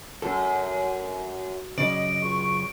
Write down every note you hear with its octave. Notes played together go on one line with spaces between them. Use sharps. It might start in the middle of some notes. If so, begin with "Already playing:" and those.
F#2 A4
F#2 C#3 D5 D#5 D7
C#2 C#6